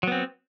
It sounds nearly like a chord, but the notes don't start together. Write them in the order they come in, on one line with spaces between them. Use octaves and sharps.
F#3 B3 C4